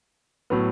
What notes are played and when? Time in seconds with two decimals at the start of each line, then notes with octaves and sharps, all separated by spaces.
0.50 A2 F#3 B3